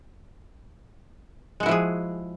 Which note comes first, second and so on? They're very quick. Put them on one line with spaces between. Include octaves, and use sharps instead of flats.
G#3 F#4 E4 F3 G#4